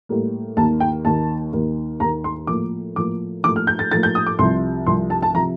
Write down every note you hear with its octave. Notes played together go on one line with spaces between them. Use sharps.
A2 G3 A#3
D#2 D#3 A#3 A5
G5
D#2 D#3 A#3 A5
D#2 D#3 A#3
D#2 D#3 A#3 A#5
C6
A2 F3 A#3 D6
A2 F3 A#3 D6
A2 F3 A#3 D6
F6
G6
A6
A2 F3 A#3 A6
G6
D#6
D6
C2 C3 F3 C6
C2 C3 F3 C6
A5
A5
C3 F3 A#5